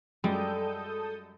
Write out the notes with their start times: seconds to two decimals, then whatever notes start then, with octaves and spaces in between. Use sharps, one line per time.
0.24 F#2 G3 G#3 A4 D#6 G6